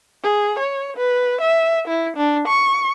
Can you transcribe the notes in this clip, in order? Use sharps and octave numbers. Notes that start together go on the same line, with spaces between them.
G#4
C#5
B4
E5
E4
D4
C#6